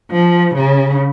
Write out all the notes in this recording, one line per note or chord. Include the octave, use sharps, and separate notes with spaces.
F3
C#3